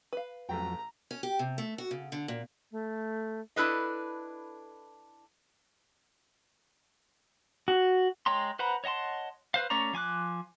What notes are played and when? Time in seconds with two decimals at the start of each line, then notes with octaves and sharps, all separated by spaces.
0.13 B4 F5
0.49 A1 F2 F#3 A3 G5 A#5
1.11 C#4
1.23 G4
1.39 C3
1.58 A3
1.78 F#4
1.91 C#3
2.12 D3
2.28 A#2
2.71 A3
3.56 D4 E4 A4 B4 D#5
7.68 F#4
8.26 G#3 C#5 G5 A#5 C6
8.59 B4 C5 F#5 A#5 B5
8.84 C#5 D#5 F#5 A5 C6
9.54 B4 C5 F5
9.70 A3 C#4 C#5 D5 A#5
9.93 F3 G#5 D6 F#6